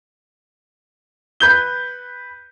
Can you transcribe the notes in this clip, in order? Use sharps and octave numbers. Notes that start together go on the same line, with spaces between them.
B4 G6 G7